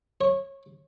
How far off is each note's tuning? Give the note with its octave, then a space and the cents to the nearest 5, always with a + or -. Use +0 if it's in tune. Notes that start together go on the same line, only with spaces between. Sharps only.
C#5 -20